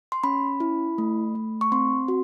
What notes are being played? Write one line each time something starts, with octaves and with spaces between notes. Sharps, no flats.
C6
C#4 B5
E4
A3
A3
C#6
C4 C6
F#4